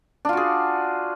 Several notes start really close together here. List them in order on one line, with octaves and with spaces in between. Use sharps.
D4 F4 F#4 G#4